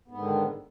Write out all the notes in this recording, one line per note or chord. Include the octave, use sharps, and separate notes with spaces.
G#2 D3 D#3 B3